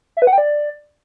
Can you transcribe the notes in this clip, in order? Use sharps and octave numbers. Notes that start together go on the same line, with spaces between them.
E5
B4
F#5
G5
D5